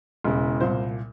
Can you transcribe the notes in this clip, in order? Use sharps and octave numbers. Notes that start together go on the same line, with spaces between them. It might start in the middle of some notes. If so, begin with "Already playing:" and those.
E1 E2 C#3
C2 A#2 C5